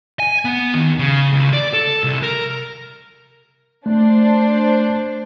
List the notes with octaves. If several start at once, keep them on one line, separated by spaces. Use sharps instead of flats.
G#5
B3
D#2
C#3
C#2
D5
A4
C2
A#4
A3 D4 C5